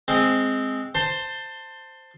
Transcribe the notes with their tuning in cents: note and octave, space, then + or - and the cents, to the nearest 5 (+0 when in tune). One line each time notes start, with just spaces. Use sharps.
G#3 +0 C4 +0
C5 +0 A5 +20 C6 +0